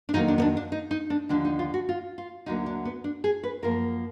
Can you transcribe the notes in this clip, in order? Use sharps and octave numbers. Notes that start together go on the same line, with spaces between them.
D4
F2 D#3 F#3 A#3 D#4
D4
B3
D4
D4
D#4
D#4
D4
D#2 D3 F3 D4
D#4
F4
F#4
F4
F4
D2 D3 F#3 A#3 D#4
D4
B3
D4
G#4
B4
F#2 F3 A#3 A#4